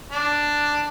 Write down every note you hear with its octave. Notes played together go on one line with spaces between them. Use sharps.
D4